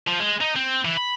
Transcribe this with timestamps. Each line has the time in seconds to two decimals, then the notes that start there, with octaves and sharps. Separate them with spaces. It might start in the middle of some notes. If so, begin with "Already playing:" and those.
0.07 F3
0.19 G#3
0.40 D#4
0.56 C4
0.85 E3
0.97 B5